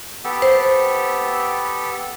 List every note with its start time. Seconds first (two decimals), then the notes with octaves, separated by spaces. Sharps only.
0.24 B3 G4 A4
0.42 C5